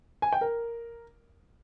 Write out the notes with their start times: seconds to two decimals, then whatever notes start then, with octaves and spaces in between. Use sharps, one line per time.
0.22 G#5
0.33 G5
0.41 A#4